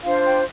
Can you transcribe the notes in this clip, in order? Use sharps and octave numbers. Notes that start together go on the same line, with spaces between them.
D4 F4 C5 F5
G5